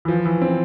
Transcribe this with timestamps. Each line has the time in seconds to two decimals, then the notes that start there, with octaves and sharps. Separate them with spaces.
0.05 E3
0.08 F3
0.25 E3
0.42 C4